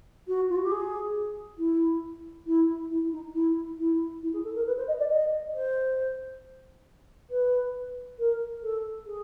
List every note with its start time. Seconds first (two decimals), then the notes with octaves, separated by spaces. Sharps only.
0.27 F#4
0.49 F4
0.55 F#4
0.63 G4
0.71 G#4
1.58 E4
2.46 E4
2.90 E4
3.11 D#4
3.33 E4
3.78 E4
4.23 E4
4.33 G#4
4.43 A4
4.55 A#4
4.66 B4
4.77 C5
4.87 D#5
4.99 D5
5.10 D#5
5.54 C5
7.30 B4
8.18 A#4
8.62 A4
9.06 G#4